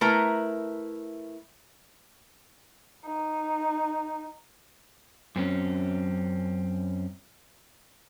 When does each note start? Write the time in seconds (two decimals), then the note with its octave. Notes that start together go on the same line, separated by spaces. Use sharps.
0.01 A3 E4 A#4 B4 A#5
3.05 D#4
5.36 F#2 C4 C#4